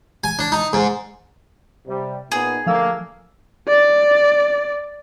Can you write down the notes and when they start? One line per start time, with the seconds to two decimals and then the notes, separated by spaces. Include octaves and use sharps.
0.24 G#5
0.39 D4
0.52 D#4
0.73 G#2
1.87 C3 G3
2.32 A#2 B3 D#4 G#4
2.66 D3 F3 A3 A#3 F5 E6
3.68 D5